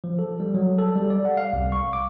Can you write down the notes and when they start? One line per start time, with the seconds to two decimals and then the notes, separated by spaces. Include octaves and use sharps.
0.04 F3
0.19 A4
0.40 G3
0.55 F#3
0.78 A4
0.96 G3
1.10 D5
1.25 F#5
1.37 F5
1.53 C2
1.72 C#6
1.93 D6